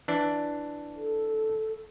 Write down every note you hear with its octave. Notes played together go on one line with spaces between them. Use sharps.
E3 D4
A4